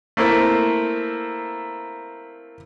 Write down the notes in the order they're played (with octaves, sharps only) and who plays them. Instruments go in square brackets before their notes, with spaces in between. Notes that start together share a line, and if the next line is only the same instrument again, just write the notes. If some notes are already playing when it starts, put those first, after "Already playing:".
[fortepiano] A3 A#3 C4 E4